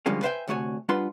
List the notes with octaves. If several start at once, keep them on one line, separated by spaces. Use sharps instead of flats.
D3 F3 G3 G#3 A#3 C#4
B4 C5 E5 F5 G5 G#5
D2 C3 A3 F#4 C#5 G#5
G3 D4 F4 B4 F#5 C6